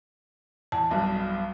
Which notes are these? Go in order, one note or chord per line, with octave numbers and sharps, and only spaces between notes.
E2 A5
B1 G2 B2